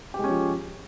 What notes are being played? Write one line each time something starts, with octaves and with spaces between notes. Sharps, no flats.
F3 G#3 C#4 G4